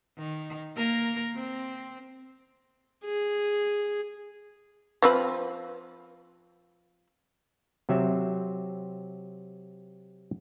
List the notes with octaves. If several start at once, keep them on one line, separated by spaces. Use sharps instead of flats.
D#3
A#3 A#4
C4
G#4
F3 C4 B4
C3 F#3 C4 E5